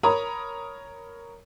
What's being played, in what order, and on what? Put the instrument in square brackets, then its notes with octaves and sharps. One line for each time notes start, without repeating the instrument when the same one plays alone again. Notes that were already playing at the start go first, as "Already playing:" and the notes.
[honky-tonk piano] A#4 C#5 A#5 B5 D#6